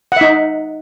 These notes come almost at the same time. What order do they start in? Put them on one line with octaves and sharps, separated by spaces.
F#5 E5 D#4